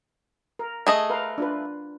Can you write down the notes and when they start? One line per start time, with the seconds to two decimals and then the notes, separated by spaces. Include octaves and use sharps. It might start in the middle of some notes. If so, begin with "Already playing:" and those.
0.59 A#4
0.87 A3 G#4 D#5
1.10 A#4 B4 F5
1.38 D4 F4 B4